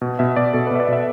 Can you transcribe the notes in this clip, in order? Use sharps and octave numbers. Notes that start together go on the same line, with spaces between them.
B2
B2 E5
B2 D5
B2 A4
B4
B2 E5
D5
B2 E5